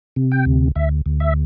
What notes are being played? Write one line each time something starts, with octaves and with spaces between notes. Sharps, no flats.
C3
G5
D2
D2 E5
D2
E5